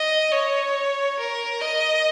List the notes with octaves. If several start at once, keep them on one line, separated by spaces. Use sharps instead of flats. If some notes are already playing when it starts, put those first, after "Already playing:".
Already playing: D#5
C#5
A#4
D#5